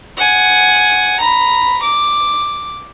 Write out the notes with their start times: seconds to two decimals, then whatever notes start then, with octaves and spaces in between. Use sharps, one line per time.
0.17 F#5 G#5
1.20 A#5 B5
1.83 D6